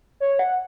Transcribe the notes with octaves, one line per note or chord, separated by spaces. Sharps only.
C#5
F#5